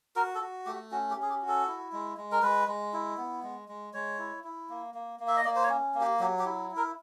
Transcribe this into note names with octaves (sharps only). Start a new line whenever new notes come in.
F#4 A#4
A4
F#4
A3 G4
F#4
C#4 F#4
G4
C#4
G#4
G4
F#4
A4
E4
G#3
G#3
A#4
G#3 B4
G#3
E4
B3
G#3
G#3
G#3 C#5
E4
E4
A#3
A#3
A#3
E5
D#5
A#3 D5
C5
C#5
C#4
A#3
G4
F#3 G4
G4
E4
E4
A#4